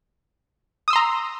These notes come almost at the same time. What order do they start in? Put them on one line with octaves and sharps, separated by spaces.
D#6 E6 C6 A#5